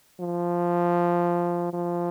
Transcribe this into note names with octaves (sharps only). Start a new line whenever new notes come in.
F3
F3